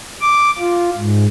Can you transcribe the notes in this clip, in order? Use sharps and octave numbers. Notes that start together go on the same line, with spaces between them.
D6
F4
G#2